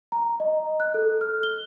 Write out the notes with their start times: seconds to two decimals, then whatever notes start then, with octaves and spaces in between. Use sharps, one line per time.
0.12 A#5
0.40 D#5
0.80 F#6
0.94 A4
1.21 F6
1.43 G7